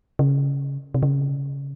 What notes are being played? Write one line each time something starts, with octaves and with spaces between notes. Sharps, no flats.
C#3
C3
C#3